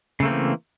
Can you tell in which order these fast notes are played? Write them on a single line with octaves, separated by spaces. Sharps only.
C#3 A3 A#3 C4 E3